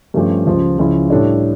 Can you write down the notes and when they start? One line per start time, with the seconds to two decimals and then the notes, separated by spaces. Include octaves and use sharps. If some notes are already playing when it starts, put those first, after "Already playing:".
0.14 G2 F3 A3 C#4 G4
0.47 C#2 C#3 F3
0.79 C#2 C#3 F3 C#4 E4
1.10 A2 G3 D4 A4 C#5